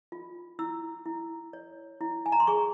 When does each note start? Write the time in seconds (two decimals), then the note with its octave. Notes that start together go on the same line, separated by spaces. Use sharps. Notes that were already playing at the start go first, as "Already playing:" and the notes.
0.12 F4
0.59 E4 E6
1.05 E4
1.53 C#5
2.01 E4
2.26 G#5
2.32 A#5
2.40 C6
2.47 G#4 C#6